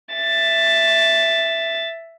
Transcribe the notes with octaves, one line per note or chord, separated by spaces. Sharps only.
E5 A6